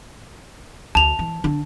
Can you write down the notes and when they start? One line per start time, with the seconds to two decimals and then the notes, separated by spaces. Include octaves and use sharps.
0.95 D2 A5 F7
1.19 E3
1.44 D3